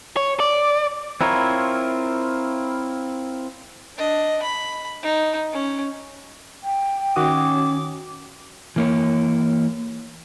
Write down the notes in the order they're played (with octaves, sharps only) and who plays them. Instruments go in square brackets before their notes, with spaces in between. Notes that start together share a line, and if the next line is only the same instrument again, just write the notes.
[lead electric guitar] C#5
D5
[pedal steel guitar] C4 E4 F4 A#4 C#5
[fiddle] D4 D#5
B5
D#4
C#4
[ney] G5
[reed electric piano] D#3 F#4 D#6 [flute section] C#4 [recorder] D6
[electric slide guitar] E3 A#3 C#5